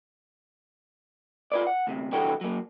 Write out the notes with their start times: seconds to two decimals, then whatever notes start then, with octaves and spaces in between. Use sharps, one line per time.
1.52 F4 B4 D5
1.67 F#5
1.87 D2 C3
2.12 C2 D3 E3 F#4 A4 G5
2.41 F#3 A#3